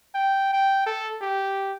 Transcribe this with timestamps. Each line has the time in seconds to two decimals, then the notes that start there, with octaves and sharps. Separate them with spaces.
0.15 G5
0.53 G5
0.86 A4
1.21 G4